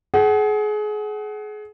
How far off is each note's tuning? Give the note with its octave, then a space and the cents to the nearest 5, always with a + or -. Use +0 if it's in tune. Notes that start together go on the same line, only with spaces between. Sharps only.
G#4 +30 F#5 +25